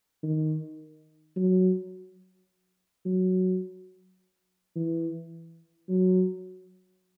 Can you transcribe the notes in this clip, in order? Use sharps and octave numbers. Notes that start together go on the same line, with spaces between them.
D#3
F#3
F#3
E3
F#3